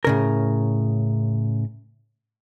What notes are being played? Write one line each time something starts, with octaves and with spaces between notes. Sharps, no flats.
A2 C#3 A#4